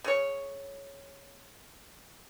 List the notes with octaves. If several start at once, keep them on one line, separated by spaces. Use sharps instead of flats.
C#3 C#5